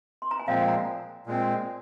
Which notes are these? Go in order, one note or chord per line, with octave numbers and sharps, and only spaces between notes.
C6
A#5
G#5
A#2 F3 G#3 C4 F5
A#5
A#2 G#3 C4